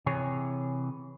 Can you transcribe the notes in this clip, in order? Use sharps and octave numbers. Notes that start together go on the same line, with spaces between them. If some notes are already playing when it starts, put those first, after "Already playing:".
C3 E3 G#4 C#5